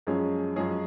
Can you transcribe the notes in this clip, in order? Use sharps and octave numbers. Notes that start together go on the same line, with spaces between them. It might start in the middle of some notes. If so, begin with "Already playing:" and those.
F#2 F3 G#3 C#4 G#4
F#2 F3 G#3 C#4 G#4